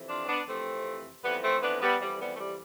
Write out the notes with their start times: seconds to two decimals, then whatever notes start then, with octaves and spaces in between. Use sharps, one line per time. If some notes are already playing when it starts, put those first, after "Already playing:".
Already playing: F2 C3 E3
0.08 D4 F4
0.22 C4
0.27 B3 D4
0.46 F2 C3 E3 A3 C4
1.23 F2 E3 G3 B3
1.42 A3 C4
1.61 B3 D4
1.81 G3 B3
2.00 F2 E3 G3
2.19 G3 B3
2.32 A3
2.38 G3